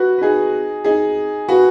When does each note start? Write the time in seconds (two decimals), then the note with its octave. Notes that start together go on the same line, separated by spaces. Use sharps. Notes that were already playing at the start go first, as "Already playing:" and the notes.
Already playing: F#4 B4
0.18 B4
0.21 D#4 G#4
0.84 D#4 G#4
1.48 F#4 B4